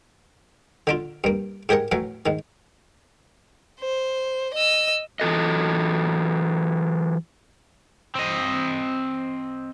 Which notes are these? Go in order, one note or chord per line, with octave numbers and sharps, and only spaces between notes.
D3 D4 F4
G2 A#3
G#2 G4 G#4 A#4 F#5
A2 E3 F#3
G#2 D#3
C5
D#5 E6
E3 F#3 A4 D#5
C4 D#5